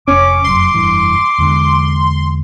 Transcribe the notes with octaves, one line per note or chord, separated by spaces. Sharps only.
F1 C#4 D6
F1 F#2 C6
F1 G2 E3
E2 D3 G#3